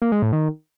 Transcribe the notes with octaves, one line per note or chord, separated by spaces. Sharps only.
A#3
G#3
A2
D#3